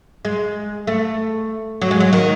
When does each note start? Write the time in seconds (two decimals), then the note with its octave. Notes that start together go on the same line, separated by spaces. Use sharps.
0.25 G#3
0.87 A3
1.81 F#3
1.91 G#3
2.00 F#3
2.13 D#3